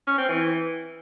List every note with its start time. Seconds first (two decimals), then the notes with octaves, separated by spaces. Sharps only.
0.07 C#4
0.18 C4
0.29 E3